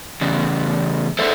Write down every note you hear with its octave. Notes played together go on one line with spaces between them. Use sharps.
E2 C#3
A4 B4 C5 E5